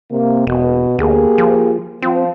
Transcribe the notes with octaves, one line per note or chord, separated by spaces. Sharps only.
C3 A#3
E1 B2
D2 A#3 G4 G#4
F3
F3 C4